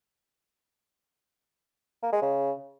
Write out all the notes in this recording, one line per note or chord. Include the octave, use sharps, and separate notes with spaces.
A#3
G#3
C#3